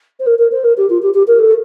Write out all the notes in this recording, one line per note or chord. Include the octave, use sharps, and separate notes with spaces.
C5
A#4
A#4
C5
A#4
G4
F4
G4
G4
A#4
A4